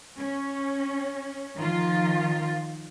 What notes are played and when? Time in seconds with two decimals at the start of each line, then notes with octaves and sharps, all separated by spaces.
0.18 C#4
1.58 D#3 F3 F4